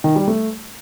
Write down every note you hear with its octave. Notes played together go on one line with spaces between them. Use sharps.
D#3
G3
A3